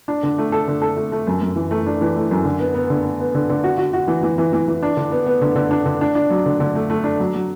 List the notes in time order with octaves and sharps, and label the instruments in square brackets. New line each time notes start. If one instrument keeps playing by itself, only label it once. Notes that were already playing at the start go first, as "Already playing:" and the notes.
[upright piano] D4
D3
A3
A4
D3
A4
A3
A3
F#2
F#2
E3
A3
D4
E3
A3
F#2
D3
B3
B3
D3
B3
B3
D3
D3
F#4
F#4
F#4
E3
E3
E3
E3
E3
D4
D3
B3
B3
D3
D3
D4
D3
D4
D4
F#3
D3
D3
A3
A3
D4
F#3
F#3